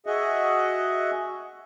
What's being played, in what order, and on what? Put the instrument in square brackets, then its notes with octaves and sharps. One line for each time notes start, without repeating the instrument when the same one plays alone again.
[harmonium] F#4 G#4 D#5 E5 F#5